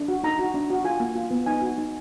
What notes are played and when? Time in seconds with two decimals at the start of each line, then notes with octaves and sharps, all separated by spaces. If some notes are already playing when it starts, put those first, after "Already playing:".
Already playing: D4
0.08 F#4
0.24 D#4 A#5
0.39 F#4
0.54 D4
0.70 F#4
0.85 F4 G#5
1.00 A#3
1.16 F4
1.31 B3
1.46 D#4 G#5
1.61 F#4
1.78 D#4